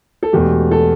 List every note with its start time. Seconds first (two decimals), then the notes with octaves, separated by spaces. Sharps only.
0.23 A4
0.33 E1 E2 B2 A3 G4
0.71 A4